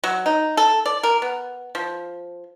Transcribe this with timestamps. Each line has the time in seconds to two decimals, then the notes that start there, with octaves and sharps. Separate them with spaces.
0.04 F#3
0.26 D#4
0.57 A4
0.86 D5
1.03 A#4
1.22 B3
1.75 F3